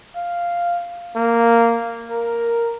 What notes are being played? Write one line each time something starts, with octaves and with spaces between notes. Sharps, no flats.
F5
A#3
A#4